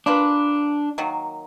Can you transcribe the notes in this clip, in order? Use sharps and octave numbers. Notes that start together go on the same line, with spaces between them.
A#3 D4 F4 B4
D#3 F#3 A#3